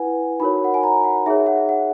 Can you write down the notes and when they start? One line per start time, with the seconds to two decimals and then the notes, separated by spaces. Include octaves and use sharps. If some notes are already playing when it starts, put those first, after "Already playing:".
Already playing: E4 B4 F#5 G#5
0.40 D#4 F#4 A#4 C#5 B5
0.64 F#5
0.74 G#5
0.83 A#5
1.04 F#5
1.26 D#4 G#4 C#5 E5
1.46 F#5
1.69 F#5